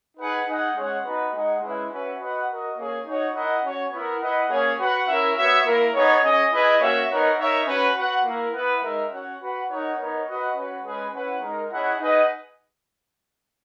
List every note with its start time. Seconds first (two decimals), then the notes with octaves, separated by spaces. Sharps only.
0.17 D#4 G#4 B4 F#5
0.47 D#4 G#4 D#5 F#5
0.75 G#3 C#4 G#4 C#5 F#5
1.04 B3 D#4 F#4 B4
1.33 G#3 D#4 G#4 D#5 F#5
1.61 G#3 C#4 E4 B4 E5
1.91 C#4 F#4 B4 E5
2.19 F#4 B4 D#5 F#5
2.48 F#4 A#4 D#5
2.77 A#3 C#4 G#4 C#5
3.06 D#4 F#4 C#5 F#5
3.34 E4 A#4 D#5 F#5
3.63 C#4 F#4 C#5
3.92 B3 E4 A#4
4.21 E4 B4 D#5 F#5
4.50 A#3 C#4 G#4 C#5
4.79 F#4 B4 F#5
5.08 C#4 E4 A#4 E5
5.36 B3 F#4 C#5 E5
5.65 A#3 E4 A#4
5.94 B3 D#4 G#4 C#5
6.22 C#4 G#4 D#5
6.52 E4 G#4 B4 D#5
6.80 A#3 C#4 F#4 C#5 E5
7.09 B3 D#4 A#4 C#5 F#5
7.38 D#4 A#4 C#5 E5
7.67 C#4 F#4 B4
7.96 F#4 B4 F#5
8.24 A#3 E4 A#4
8.53 B3 E4 B4
8.81 G#3 D#4 A#4 E5
9.10 C#4 F#4 C#5 F#5
9.40 F#4 B4 F#5
9.68 D#4 A#4 C#5 F#5
9.97 B3 D#4 A#4 C#5
10.27 F#4 B4 D#5 F#5
10.55 C#4 F#4 B4
10.83 G#3 C#4 G#4 B4
11.12 C#4 E4 B4 F#5
11.41 G#3 D#4 A#4
11.69 C#4 E4 G#4 D#5 F#5
11.99 D#4 G#4 B4 D#5 F#5